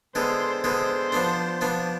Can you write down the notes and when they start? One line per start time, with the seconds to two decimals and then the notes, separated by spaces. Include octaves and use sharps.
0.15 D3 G#3 B3 C5
0.64 D3 G#3 B3 C5
1.12 F3 B3 D4
1.61 F3 B3 D4